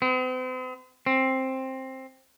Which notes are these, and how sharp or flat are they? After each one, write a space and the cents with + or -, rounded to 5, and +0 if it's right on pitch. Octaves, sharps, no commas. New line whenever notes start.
C4 -45
C4 +10